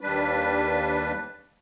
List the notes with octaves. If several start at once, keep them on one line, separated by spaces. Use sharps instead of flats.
D#2 G3 D4 B4